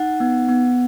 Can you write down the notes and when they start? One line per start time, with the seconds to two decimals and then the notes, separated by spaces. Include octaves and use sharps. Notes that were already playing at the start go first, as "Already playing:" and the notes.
Already playing: D#4 F#5
0.20 B3
0.49 B3